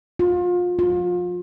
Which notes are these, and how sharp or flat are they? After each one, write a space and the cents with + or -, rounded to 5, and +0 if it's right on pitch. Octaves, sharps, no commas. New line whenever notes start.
F4 +30
F4 +30